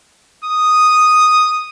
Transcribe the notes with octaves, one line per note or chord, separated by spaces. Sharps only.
D#6